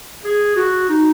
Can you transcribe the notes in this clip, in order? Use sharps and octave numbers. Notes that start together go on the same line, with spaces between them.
G#4
F#4
D#4